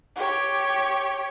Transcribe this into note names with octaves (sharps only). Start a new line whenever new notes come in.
G4 C#5